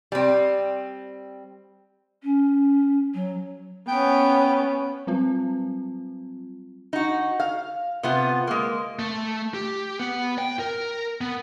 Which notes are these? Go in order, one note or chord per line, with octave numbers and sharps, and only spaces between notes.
G3 C4
C#4
F#3
B3 C#4 G5
F#3 G3 C4 F4
D#4 F#4
F5
C3 B3 F4
G#3 A#3
A3
G4
B3
G5
A#4
B3